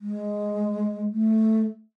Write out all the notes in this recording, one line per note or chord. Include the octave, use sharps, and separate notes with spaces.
G#3
A3